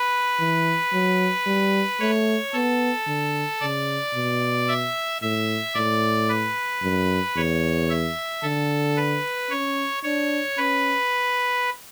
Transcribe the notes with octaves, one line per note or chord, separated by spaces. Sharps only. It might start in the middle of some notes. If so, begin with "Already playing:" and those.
Already playing: B4
E3
F#3
G3
A3 C#5
B3 A4
D3
C#3 D5
B2
E5
A2 E5
A2 D5
B4
F#2
E2 C#5
E5
D3 A4
B4
C#4 C#5
D4 C#5
C#4 B4